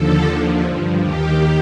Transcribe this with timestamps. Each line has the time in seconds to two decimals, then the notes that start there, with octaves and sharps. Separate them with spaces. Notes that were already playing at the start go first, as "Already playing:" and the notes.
Already playing: D#2 D3 F3 A4
0.25 D#2 D3 F3
0.63 G2 F3
1.00 D#2 D#3 G4